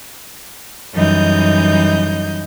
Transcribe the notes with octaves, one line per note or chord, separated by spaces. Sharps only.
F#2 E3 G3 D#4 D#5 G6